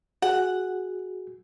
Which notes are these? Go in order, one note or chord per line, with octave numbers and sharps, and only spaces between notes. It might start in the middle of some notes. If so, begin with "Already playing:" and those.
F#4 G#4 F#5